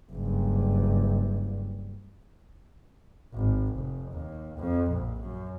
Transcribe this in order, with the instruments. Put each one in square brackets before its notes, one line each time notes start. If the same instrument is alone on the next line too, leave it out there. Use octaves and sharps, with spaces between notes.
[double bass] F#1 G2
G#1
F1
D#2
F2
A#1
F#2